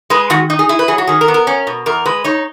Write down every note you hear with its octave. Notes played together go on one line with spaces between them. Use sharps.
G#3 B4
D#3 F#4
D#4
G#4
E4 G#4
B4
F#3 G#4
F#4
D#3 G#4
A#4
B3
A#4
C#4
B2
E2 A#4
G#3 B4
D#4 C#5